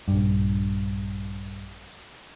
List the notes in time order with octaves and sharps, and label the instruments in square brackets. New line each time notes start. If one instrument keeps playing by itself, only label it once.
[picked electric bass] A#1 G2